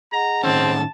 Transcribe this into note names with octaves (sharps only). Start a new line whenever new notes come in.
G#4 D#5 F#5 A#5
A2 D#3 C4 C#4 A5